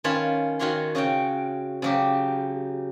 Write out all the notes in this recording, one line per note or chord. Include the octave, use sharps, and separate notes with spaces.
D#3 C#4 F4 C#5 A5 B5
D#3 F4 F#4 C#5 F5 C6
C#3 F#4 C#5 G5
C#3 F#3 G4